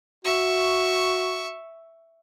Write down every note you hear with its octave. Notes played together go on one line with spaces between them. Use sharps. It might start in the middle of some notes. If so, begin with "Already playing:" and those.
F#4 E5 C#6